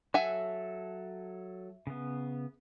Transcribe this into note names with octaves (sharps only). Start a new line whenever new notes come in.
F#3 A4 E5 F#5 G#5
C#3 B3